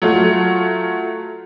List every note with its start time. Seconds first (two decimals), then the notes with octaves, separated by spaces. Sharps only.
0.02 F#3 A3 F4